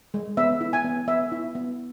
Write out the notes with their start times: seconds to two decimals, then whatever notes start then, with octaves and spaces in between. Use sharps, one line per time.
0.14 G#3
0.37 B3 E5
0.61 E4
0.73 G#5
0.84 B3
1.08 B3 E5
1.32 E4
1.55 B3